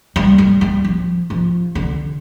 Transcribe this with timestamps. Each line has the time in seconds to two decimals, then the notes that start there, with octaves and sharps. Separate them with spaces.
0.16 G3
0.38 G3
0.61 G3
0.85 F3
1.30 F3
1.75 D3